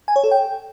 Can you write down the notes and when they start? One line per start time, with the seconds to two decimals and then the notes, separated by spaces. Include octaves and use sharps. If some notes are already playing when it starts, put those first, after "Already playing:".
0.08 G#5
0.16 C#5
0.24 A4
0.31 G5